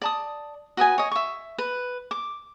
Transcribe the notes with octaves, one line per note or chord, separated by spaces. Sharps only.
D5 A5 D#6
F#4 B4 D#5 G#5
C#5 D#5
E5 C#6
B4
D6